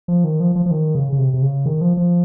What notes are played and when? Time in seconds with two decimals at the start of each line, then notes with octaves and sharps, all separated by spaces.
0.08 F3
0.24 D#3
0.40 F3
0.56 F3
0.66 F3
0.71 D#3
0.95 C#3
1.13 C#3
1.18 C3
1.34 C3
1.42 C#3
1.66 D#3
1.81 F3
1.97 F3